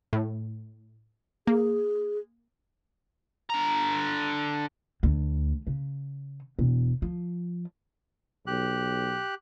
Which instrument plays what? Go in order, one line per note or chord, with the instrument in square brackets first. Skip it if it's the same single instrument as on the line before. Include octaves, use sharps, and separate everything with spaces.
[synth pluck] A2
[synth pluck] A#3 [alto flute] G#4
[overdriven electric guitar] D3 A#5
[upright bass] D2
C#3
E1
F3
[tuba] B1 [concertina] G4 F#6